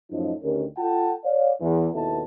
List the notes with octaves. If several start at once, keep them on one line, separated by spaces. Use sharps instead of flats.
F#2 A2 F3 D#4
D2 D#3 C#4 G4 A#4
F4 A4 F#5 G5 A5
C#5 D5 F5
E2
D#2 B2 B3 E4 A4 A5